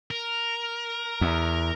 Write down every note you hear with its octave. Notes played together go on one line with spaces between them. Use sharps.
A#4
E2